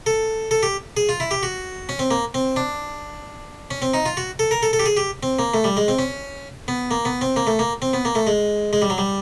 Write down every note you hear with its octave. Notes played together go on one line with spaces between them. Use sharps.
A4
A4
G4
G#4
F4
E4
G4
F#4
C#4
C4
A#3
C4
D4
C#4
C4
D#4
F4
F#4
A4
A#4
A4
A4
G4
G#4
G4
C4
A#3
A3
G3
G#3
C4
C#4
B3
A#3
B3
C4
A#3
A3
A#3
C4
B3
A#3
A3
G#3
G#3
G3
F#3
G3